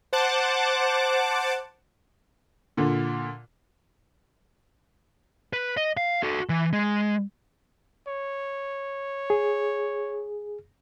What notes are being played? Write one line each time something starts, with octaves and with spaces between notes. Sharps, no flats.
C5 F#5 A5 D6
A#2 D3
B4
D#5
F5
F#4 A4
E3
G#3
C#5
G#4